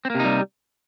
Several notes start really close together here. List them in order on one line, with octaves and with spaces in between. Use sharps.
C4 A#3 C3 D#4 G3